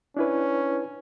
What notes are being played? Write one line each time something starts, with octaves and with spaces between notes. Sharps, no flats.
C#4 D4 E4 B4